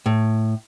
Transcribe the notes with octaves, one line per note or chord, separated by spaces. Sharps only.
A2